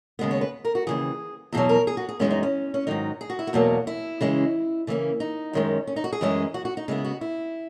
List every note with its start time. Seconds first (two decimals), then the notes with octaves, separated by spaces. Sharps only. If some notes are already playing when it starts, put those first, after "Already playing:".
0.19 D#2 C#3 G#3 B3
0.31 C#5
0.41 B4
0.65 A#4
0.75 F#4
0.87 D#2 C#3 E3 G#4
1.53 E2 B2 F#3 G#4
1.69 A#4
1.87 G#4
1.97 F#4
2.09 G#4
2.19 F#2 E3 G#3 B3 C#4
2.30 D#4
2.43 C#4
2.74 C#4
2.87 G#2 D#3 F#3 D#4
3.21 G#4
3.30 F#4
3.39 E4
3.47 F#4
3.53 E2 B2 F#3 A#3
3.87 E4
4.21 C#3 E3 G#3 C#4
4.87 C#3 E3 A#3 C#4
5.20 D#4
5.53 F#2 D#3 G#3 C#4
5.87 C#4
5.96 D#4
6.04 F#4
6.12 G#4
6.21 F#2 E3 G#3 C#4
6.54 F#4
6.65 F#4
6.77 D#4
6.88 C#3 G#3 B3 E4
7.04 F#4
7.21 E4